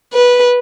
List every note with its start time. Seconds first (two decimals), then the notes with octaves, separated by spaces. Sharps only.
0.13 B4